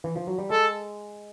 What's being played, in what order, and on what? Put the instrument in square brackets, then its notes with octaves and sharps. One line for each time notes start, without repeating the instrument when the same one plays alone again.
[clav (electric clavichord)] E3
F3
F#3
G3
[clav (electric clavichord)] G#3 [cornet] A4